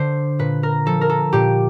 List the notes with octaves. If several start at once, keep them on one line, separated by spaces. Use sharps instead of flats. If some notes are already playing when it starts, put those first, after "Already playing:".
Already playing: D3 C5
A#2 B4
A#4
F3 A4
A#4
A4
A#2 G4